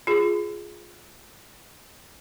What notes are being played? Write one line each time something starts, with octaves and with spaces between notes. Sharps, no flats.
F4 G#4